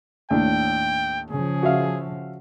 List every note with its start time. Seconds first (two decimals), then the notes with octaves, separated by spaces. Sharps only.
0.30 D#2 A2 D4 G5
1.30 C#3 F3 G#4
1.63 F#4 E5 F5